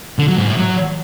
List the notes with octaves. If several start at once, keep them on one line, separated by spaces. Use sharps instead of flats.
D3
F#3
G#2
A2
F#3